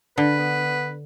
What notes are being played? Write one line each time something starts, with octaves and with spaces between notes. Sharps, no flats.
D3 B4
B3